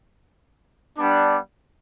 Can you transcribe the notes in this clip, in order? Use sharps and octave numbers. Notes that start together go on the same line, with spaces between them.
G3 B3 D4